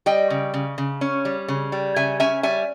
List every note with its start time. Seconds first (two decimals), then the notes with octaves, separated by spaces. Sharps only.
0.06 G3 D#5 G5
0.30 C#3
0.54 C#3
0.78 C#3
1.01 C#4
1.25 G3
1.48 C#3
1.72 G3
1.96 C#3 E5 G#5
2.20 C#4 E5 G#5
2.43 G3 E5 G#5